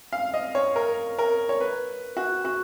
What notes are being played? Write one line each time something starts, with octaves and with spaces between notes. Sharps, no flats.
F5
D#5
C#5
A#4
A#4
C#5
B4
F#4
F#4